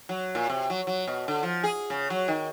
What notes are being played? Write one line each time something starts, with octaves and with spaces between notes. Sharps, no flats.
F#3
A#2
C3
F#3
F#3
B2
D3
F3
G#4
C#3
F#3
D#3